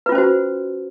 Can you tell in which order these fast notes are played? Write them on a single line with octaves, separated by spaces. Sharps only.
B4 F4 C#4 C5 F#4